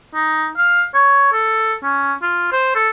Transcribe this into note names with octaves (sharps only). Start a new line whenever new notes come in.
D#4
F5
C#5
A4
C#4
F4
C5
A4